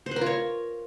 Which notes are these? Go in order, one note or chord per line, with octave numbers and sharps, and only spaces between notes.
C5
B4
A#4
F4
C#5